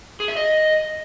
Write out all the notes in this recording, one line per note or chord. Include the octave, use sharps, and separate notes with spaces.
G#4
E5
D#5